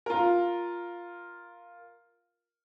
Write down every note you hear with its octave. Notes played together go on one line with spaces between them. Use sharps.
F4 A#4